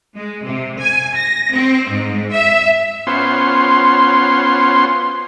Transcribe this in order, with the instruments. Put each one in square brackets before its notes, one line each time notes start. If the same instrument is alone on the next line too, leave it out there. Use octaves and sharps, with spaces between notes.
[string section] G#3
C3
G#5
A#6
C4
G#2
E5
[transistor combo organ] B3 C#4 F4 C5 C6